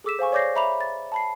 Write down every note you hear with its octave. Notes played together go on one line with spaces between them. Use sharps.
G#4 A4 D6 E6 B6 E7
C5 F5 G#5 C#6
C#5 D5 D6 G6 A#6 C7
E5 A#5 B5 D6 F7
A6
A5 B5 C7